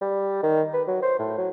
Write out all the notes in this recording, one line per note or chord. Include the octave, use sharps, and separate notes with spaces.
G3
D#3
B4
F#3
C5
A2
F#3